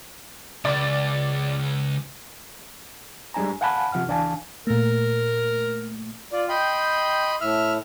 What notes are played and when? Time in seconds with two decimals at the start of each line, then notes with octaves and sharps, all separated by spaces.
0.65 C#2 D5
3.34 G3 G#3 D4 G#5 A#5
3.61 F5 F#5 G#5 A5 B5 F#6
3.92 C3 F3 F#5 F6
4.07 C#2 E3 D4 F5 G#5 A5
4.67 A#2 A3 A#4
6.32 F4 D5
6.49 D#5 G5 B5 C6
7.41 A2 E5 F6